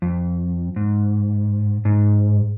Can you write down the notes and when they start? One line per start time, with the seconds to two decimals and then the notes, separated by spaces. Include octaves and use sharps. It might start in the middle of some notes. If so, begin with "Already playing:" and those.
0.02 F2
0.76 G#2
1.85 G#2